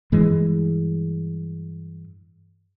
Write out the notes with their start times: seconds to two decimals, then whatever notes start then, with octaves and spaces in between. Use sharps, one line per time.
0.12 G2 E3 G#3